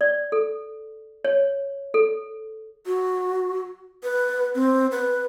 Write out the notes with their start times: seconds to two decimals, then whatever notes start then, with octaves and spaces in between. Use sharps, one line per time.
0.01 D5
0.32 A4
1.24 C#5
1.94 A4
2.86 F#4
4.03 B4
4.55 C4
4.92 B4